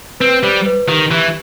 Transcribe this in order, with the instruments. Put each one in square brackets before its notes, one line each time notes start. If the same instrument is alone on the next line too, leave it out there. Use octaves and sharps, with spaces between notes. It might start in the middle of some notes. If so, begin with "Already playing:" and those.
[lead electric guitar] C4 [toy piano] B4
[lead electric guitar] G3 [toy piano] C5
[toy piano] B4
[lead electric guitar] D#3 [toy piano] G4
[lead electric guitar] E3 [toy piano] G4